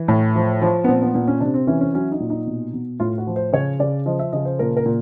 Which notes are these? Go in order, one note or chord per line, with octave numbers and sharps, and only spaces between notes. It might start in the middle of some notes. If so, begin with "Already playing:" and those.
Already playing: E3
A2
F3
F3
B3
A#2 C4
B3
A#2 B3
C#4
C3 D4
C4
E3 C#4
C#4
F#3 C#4
D#4
A#2
D#4
B2
B2
A2 F4
F#4
F3
C5
C#3 C#5
C#3 D5
F3 D#5
E5
C#3 D#5
C5
A#2 A#4
A#4
A#2